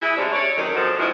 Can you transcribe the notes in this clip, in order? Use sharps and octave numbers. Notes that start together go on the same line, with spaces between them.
E4 G#4
D2 G#2 C3 C#4 D4
C#5 D5
F#2 D3 D#3 C4 D#4
C3 F3 F#4 G#4 A4 C5
G#2 B2 F3 G#3 D4 E4